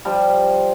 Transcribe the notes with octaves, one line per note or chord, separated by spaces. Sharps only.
F3 G3